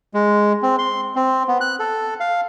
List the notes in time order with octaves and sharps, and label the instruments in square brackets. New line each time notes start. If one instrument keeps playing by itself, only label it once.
[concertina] G#3
C4
C6
C4
B3
F#6
A4
F5